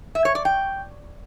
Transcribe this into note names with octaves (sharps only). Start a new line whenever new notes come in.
E5
C#5
D5
G5